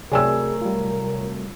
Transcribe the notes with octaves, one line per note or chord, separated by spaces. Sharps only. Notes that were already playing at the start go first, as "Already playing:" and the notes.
C3 F#3 A3 G#4 A#4 D5 G#5 E6
G3 F4